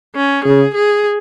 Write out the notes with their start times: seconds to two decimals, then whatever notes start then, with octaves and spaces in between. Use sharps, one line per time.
0.16 C#4
0.45 C#3 G#4
0.75 G#4